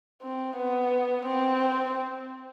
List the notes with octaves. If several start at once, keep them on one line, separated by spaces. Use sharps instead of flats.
C4
B3
C4